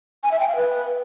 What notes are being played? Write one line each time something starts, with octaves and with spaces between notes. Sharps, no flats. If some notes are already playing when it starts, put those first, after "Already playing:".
G#5
E5
G5
F5
B4